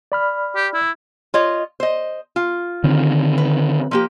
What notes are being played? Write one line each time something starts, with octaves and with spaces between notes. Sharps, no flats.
D5 B5 F6
G4
E4
F4 C#5 D#5
C5 D#5
F4
D3 D#3 C4
B4
F3 A#3 G4